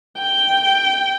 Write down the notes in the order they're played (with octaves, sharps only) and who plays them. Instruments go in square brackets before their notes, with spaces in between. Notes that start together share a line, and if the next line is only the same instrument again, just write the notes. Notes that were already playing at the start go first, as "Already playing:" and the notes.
[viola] G5